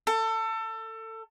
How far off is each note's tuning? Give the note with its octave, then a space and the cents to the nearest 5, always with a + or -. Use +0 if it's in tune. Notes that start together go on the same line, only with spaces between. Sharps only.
A4 +25